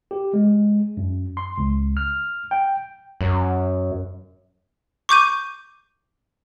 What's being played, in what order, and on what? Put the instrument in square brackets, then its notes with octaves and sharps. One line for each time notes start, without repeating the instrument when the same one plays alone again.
[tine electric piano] G4
G#3
F#2
C6
C#2
F6
G5
[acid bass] F#2
[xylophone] C#6 D6 G6 D#7